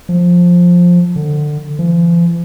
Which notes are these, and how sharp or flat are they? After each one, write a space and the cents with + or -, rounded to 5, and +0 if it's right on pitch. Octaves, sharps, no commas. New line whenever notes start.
F3 +10
D3 +20
F3 -45